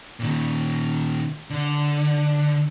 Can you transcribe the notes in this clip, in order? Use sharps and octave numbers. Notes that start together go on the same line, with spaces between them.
A#2 D#3
D3